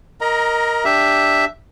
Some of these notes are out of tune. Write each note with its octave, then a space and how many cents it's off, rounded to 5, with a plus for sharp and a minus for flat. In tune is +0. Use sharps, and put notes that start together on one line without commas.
A#4 +0 D#5 +0 A#5 +25
D4 +0 G4 +0 E5 +0